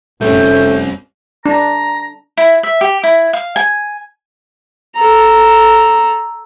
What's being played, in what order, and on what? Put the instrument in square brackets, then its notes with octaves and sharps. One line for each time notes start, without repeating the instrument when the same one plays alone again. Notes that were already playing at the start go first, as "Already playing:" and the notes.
[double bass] F1 C#4 [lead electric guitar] G3 C4 [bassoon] A3 [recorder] G6
[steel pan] D4 [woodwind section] A#5
[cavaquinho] E4
E5
G4
E4
F5
G#5
[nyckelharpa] A4 A#5